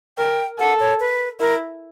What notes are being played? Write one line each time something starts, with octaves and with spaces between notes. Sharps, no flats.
A#4 G5
A4 F#5
C#5
B4
E4 A#4